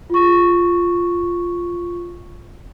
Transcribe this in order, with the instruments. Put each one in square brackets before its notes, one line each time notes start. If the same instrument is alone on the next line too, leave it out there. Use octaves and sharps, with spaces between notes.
[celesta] F4 C#6